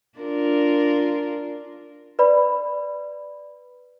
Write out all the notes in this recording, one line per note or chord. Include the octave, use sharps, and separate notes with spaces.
D4 F4 A#4
B4 D5 B5